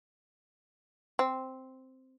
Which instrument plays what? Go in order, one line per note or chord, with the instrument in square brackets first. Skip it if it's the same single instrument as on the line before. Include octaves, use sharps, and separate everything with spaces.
[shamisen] C4